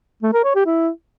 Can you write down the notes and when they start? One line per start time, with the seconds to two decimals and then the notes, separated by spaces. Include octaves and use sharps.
0.23 A3
0.34 A#4
0.44 C#5
0.55 G4
0.66 E4